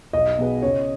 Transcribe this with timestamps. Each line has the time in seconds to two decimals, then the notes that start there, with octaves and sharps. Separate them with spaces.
0.13 B1 D#5
0.38 B2 B3 G#4 B4
0.62 C#3 C#5